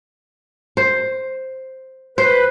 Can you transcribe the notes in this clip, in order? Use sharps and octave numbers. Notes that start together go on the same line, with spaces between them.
C5
B4 C5